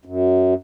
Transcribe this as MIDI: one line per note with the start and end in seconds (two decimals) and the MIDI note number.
0.05 0.54 42